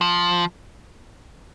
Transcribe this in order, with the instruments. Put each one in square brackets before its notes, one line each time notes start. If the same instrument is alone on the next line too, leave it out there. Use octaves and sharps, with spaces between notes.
[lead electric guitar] F3